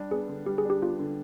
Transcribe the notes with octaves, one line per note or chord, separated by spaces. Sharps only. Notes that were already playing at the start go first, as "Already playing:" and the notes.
Already playing: G3 D4
B3 G#4
D3
G3 G4
G#4
D4 G4
B3 F4
D3